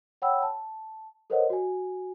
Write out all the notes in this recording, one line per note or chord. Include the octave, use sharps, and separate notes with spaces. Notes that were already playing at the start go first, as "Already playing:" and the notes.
C#5 F#5 G5 B5 E6
A5
A4 A#4 C5 C#5 D#5 F#5
F#4 G#5